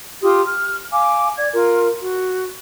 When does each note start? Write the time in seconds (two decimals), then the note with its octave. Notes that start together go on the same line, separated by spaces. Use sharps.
0.23 F4 G4 C6 D#6
0.46 F6
0.91 F5 G#5 D6
1.37 D5 G#6
1.53 F4 A#4
2.02 F#4